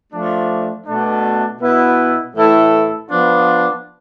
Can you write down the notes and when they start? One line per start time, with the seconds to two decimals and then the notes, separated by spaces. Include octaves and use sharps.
0.12 F3 A3 D4
0.85 B2 A3 D4
1.60 B2 B3 E4
2.34 A2 E3 A3 E4 A4
3.08 F3 B3 D4 F4